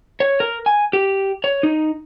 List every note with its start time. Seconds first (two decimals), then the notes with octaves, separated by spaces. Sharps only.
0.20 C#5
0.40 A#4
0.66 G#5
0.93 G4
1.44 C#5
1.63 D#4